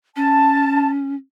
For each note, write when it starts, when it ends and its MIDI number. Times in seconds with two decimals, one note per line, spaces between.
0.16 1.15 61
0.16 0.89 81